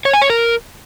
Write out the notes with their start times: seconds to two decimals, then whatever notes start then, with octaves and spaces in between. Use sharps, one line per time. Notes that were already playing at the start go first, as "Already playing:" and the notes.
0.05 C#5
0.13 G#5
0.22 C#5
0.30 A#4